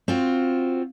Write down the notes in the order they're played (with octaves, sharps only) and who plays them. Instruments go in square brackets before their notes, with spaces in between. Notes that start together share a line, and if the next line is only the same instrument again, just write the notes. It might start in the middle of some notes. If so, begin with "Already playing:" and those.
[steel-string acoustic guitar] C4 F4 F#4